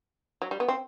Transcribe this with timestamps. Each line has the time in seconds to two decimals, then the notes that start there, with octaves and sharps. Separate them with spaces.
0.42 F#3
0.51 G3
0.60 B3
0.68 C4